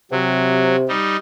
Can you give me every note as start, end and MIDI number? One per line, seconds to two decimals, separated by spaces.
0.11 0.89 48
0.11 0.76 54
0.88 1.17 55
0.88 1.17 63